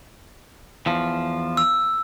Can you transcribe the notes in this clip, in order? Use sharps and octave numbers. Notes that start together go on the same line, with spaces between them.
E2 F3
E6